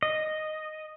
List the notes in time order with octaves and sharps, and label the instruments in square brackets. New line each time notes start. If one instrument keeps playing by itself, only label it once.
[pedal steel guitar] D#5